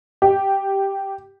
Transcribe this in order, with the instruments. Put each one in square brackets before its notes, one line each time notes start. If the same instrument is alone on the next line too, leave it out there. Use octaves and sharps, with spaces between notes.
[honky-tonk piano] G4